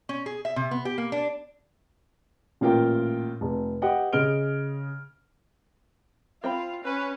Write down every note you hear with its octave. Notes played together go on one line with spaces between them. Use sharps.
C#4
G#4
E5
C3
B3
G4
A#3
D4
A1 A#2 F4 A#4 G5
F1
G4 B4 D#5 F#5 G5
C#3 D#5 F6 D7 G7
C4 F4 G5 B5
C#4 B4